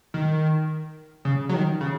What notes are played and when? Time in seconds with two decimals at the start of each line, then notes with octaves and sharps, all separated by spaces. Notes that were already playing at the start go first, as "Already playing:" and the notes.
0.14 D#3
1.25 C#3
1.49 F#3
1.54 D#3
1.81 C#3